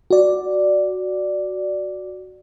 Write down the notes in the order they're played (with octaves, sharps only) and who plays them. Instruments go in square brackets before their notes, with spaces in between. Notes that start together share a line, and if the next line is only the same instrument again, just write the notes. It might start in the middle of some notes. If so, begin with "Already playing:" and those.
[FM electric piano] F#4 D5